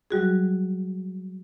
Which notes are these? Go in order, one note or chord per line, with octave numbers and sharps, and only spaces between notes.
F#3 G3 F#4 G#4